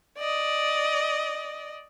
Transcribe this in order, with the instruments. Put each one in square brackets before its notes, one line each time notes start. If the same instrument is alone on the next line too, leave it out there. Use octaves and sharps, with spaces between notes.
[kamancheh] D5 D#5